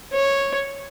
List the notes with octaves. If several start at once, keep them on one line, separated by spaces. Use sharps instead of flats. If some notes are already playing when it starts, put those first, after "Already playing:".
C#5